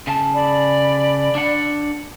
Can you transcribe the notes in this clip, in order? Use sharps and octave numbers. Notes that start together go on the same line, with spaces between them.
C#3 A5
D5 B5
D4 F#5